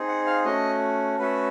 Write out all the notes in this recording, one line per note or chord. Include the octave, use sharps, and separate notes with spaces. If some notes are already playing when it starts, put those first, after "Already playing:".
Already playing: C4 D#4 G#4
F#5
F5
A3 C#4 F#4 D#5
A3 C#4 F#4 A4 B4